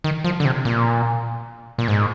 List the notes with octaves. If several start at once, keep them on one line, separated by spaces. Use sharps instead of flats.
D#3
F3
D3
C3
A#2
A#2
G#2